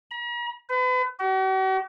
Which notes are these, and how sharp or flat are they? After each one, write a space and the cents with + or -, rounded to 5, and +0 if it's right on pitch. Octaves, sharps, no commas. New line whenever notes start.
A#5 +45
B4 +40
F#4 +45